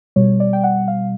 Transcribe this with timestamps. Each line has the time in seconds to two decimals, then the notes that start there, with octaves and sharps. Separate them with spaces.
0.16 B2 G3 C#5
0.40 D5
0.53 G5
0.64 F#5
0.88 F5